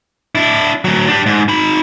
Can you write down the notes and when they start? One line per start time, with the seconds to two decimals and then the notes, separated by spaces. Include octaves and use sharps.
0.35 D4 E4
0.85 D2 F#3
1.08 D4 G4
1.26 G#2
1.48 D#4 B5